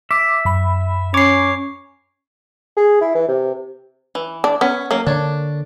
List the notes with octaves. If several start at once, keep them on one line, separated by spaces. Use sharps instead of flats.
E5 D6
F#2 B5
C#4 C#5 D6 C7
G#4
E4
E3
C3
E3
D4
B3 C#4
F#3 A#3 C#4
D3 D4 C#5